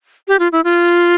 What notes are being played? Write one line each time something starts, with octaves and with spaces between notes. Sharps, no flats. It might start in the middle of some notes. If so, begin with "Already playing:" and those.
G4
F4
E4
F4